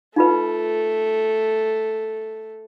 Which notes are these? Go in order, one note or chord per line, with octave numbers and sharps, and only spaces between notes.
A3 D#4 F4 B4